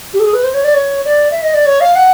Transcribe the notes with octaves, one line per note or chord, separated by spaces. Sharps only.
G4
A4
G#4
B4
C5
C#5
D5
C#5
D5
E5
D#5
D5
C#5
F5
F#5